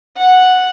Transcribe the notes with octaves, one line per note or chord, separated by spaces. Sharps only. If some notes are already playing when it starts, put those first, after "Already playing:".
F#5